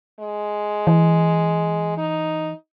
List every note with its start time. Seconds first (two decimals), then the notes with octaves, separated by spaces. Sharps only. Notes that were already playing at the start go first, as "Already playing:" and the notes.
0.20 G#3
0.87 E3
1.98 D#4